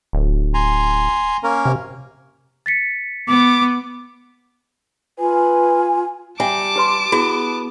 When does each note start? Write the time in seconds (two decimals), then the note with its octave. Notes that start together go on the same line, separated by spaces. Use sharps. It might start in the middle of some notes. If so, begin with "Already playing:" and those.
0.13 D1
0.54 G#5 A#5 C6
1.43 A#3 C#4 A#4
1.66 C3
2.66 A6 B6 C#7
3.28 B3 D6
5.19 F4 B4 G#5
6.40 G3 E5 F#5 G#5 A5 D6
6.76 G4 B4 C6
7.12 B3 E4 F#4 G#4